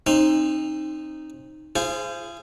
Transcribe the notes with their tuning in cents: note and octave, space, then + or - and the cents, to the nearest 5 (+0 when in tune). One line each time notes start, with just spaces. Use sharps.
C4 +30 D#4 -5 C6 +0
F4 -40 G#4 +0 C5 +0